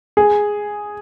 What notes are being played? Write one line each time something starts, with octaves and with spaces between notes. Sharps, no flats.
G#4